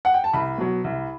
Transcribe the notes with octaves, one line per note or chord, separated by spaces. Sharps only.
F#5
G5
A5
C2 B5
B2 F#3
C2